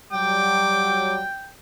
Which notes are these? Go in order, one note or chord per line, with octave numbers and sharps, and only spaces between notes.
F#3 G3 G5 D6